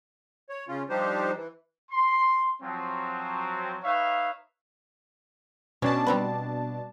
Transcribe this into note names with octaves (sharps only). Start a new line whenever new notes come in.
C#5
C#3 C#4 F4
F3 G3 D4 D#4 G4 C5
E3
C6
F3 F#3 C4
D#4 B4 C#5 E5 F5
B2 C#4 D4 A5
G3 C4 B4